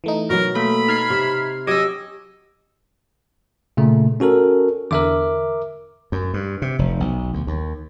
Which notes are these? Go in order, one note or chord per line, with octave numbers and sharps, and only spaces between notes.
E3 A3 D#4
B2 F#3 A#4
A3 A#3 A4 B5 B6
D#4 F6 G#6 C7
C3 E5
F#3 C#4 G4 D#5 D6 E6 G#6
A#2 C#3 A3
C#4 F#4 A4 A#4
E2 D3 A#4 E5 D6
F#2
G2
C3
F1
B1
D2
D#2